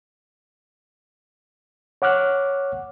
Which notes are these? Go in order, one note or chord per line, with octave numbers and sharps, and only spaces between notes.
C#5 F#5 D6 F6 F#6